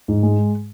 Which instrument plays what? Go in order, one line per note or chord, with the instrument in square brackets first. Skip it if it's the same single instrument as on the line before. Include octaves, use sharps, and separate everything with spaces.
[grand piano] G#2
G#3